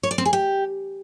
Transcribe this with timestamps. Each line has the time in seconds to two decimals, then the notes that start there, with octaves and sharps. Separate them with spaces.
0.03 C#5
0.11 D5
0.18 C4
0.25 G#4
0.33 G4